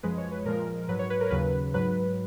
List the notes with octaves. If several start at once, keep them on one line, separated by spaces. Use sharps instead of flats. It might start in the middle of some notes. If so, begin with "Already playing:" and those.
F#2 F3 G#3 B4
C#5
B4
A#2 F3 G#3 A#4
G#2 F#3 B4
C#5
B4
A#4
D#2 C#3 F#3 B4
G#2 F#3 B4